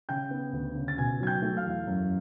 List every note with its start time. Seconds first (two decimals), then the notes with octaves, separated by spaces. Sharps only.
0.09 C#3 G5 G6
0.31 B3
0.53 D2
0.75 C#3
0.88 A6
0.97 B2 G#5 G#6
1.20 F#3 G#6
1.27 G5 G6
1.42 A3
1.57 F5 F6
1.64 E2
1.87 F#2